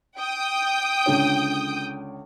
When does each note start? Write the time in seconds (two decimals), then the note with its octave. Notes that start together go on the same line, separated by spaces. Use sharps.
0.18 G5 D#6 G6
1.06 C#2 D3 C#5